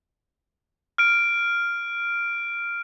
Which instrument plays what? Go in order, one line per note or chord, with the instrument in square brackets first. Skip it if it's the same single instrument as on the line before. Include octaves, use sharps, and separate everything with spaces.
[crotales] F6 D7